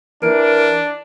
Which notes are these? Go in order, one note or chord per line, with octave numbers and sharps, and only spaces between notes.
E3 D4 A#4